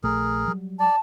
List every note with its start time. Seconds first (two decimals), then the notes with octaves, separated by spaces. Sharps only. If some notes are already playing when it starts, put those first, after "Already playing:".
0.03 A#1 A3 G#4 A#4
0.48 F#3 G3
0.80 D5 A5